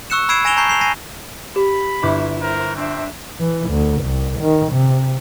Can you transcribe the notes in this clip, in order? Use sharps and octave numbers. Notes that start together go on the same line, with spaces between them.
C#6 E6 F#6 C#7 E7
B5 E6 G#6 C7 D7 E7
G#5 A#6 D7 E7 F7 G7
A5 A#5 C#6 G6 C7 G7
G6 C7 F7 G7
G#5 A#6 C7 D#7
G4 B5
G1 E4 D6
E4 A#4 C5
C4 D4 E5
E3
D2
C2
D#3
C3